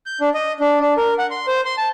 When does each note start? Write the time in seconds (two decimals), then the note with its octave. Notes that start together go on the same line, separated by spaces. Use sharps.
0.06 G6
0.21 D4
0.34 D#5
0.60 D4
0.80 D4
0.97 A#4
1.19 F#5
1.31 C6
1.47 C5
1.65 C6
1.78 A5